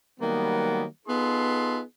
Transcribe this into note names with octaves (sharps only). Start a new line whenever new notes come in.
D#3 F#3 G3 A#3 B3
B3 D#4 F4 G#4 A4 C6